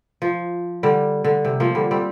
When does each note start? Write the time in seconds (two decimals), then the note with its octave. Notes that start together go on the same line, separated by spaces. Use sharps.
0.22 F3
0.83 D3 G3
1.25 D3
1.45 C3
1.60 F3 A#3
1.75 D3 G3
1.91 G3 C4